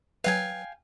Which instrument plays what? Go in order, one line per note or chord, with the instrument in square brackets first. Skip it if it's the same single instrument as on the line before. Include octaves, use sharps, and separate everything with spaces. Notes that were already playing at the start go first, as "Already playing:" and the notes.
[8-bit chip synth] F#3 B4 [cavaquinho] F5 G5 G#5